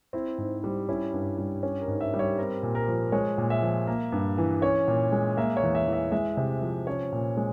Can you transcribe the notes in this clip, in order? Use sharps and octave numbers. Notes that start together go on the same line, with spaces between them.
C4 E4
G#2
G3
C#4 E4
G2
G3
C#4
A#4
G#2
E5
G3
C#5
C4 A#4
A#2
A#4
F3
G#3 C#5
A#2
E5
F3
A#3
G2
E3
C#4 C#5
A#2
G#3
A#3 E5
C#5
E2
E5
E3
E5
G#3 E5
C3
F3
C#4 C#5
A#2
G#3